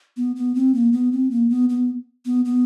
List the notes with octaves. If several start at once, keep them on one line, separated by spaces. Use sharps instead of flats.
B3
B3
C4
A#3
B3
C4
A#3
B3
B3
B3
B3